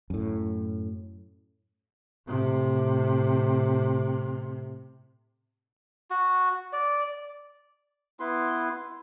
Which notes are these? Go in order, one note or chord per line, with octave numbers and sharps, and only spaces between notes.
F#2 A2
A2 C3
F#4
D5
B3 E4 B4 C6